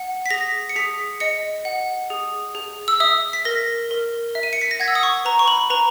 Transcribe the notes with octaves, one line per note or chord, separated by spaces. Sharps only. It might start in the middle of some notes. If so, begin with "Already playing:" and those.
Already playing: F#5
B6
G#4 A#6
C#7
G#4 B6
D#5 C#7
F#5
G#4
G#4
E6
E5 D#6
B6
A#4 A#6
A#4
E5
D#7
C#7
B6
A#6
F#5 G#6
E6
D#6
C#6
B4 A#5
C#6
B5
B4 A#5